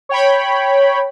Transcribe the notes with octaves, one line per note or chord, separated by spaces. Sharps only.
C#5 G5 B5